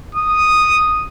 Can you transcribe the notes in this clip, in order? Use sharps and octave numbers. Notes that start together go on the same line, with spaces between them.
D#6